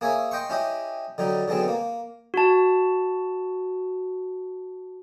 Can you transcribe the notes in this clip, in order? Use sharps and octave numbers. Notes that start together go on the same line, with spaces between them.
A#3 G#4 C#5 E5 G#5
D#5 G5 C6 C#6
C#4 E4 G4 D#5
D3 F#3 G3 D#4
D3 F#3 G#3 B3 C4
A#3
F#4 A5